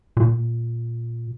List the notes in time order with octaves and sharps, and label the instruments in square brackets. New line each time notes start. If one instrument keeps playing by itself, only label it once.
[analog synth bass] A#2